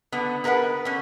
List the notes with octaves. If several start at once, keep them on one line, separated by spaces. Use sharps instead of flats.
D3 B3
B3 A#4 B4 F5 F#5
D3 C#4